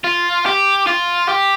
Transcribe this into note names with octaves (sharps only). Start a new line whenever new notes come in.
F4
G4
F4
G4